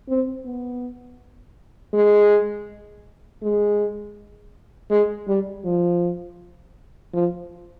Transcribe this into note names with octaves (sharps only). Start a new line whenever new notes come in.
C4
B3
G#3
G#3
G#3
G3
F3
F3